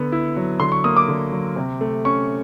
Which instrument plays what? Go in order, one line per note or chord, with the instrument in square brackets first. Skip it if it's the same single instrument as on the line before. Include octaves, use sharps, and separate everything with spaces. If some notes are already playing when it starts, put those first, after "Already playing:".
Already playing: [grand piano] D3 B3
E4
F#3
D3 C6
C#6
A#3 D#6
D6
D3
F#3
C3
A3
C#4 C#6